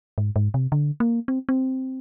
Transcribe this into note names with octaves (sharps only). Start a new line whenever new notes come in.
G#2
G#2
C3
D3
A#3
C4
C4